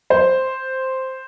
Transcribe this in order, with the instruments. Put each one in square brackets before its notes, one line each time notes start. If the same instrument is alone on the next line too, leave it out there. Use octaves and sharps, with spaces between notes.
[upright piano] C5